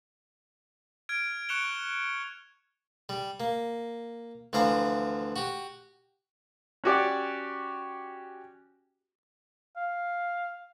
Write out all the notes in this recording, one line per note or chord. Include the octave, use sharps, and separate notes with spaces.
F6 G#6 D7
C#6 F#6 C#7 E7 F7 G7
G3
A#3
D2 E3 F3 F5 A#5
F#4 G4
C#4 F#4 G4 D5
F5